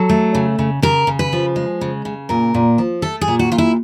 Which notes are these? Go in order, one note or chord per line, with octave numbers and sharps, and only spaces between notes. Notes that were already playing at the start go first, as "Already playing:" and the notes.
Already playing: F#3 A4
A3
C#3
C#3
C#3 A#4
C#3
B4
F3
G#3
C#3
C#3
A#2 A#4
A#2
F3
A3 A4
G#4
A#2
F#4
A#2 F4
E4